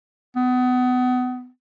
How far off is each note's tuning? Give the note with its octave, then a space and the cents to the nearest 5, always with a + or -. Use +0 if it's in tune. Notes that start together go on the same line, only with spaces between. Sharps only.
B3 +30